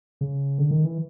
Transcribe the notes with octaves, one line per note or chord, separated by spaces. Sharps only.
C#3
D3
D#3
E3